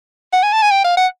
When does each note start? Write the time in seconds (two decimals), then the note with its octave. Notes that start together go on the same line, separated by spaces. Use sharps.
0.33 F#5
0.43 G#5
0.53 A5
0.62 G#5
0.71 G5
0.84 F5
0.97 F#5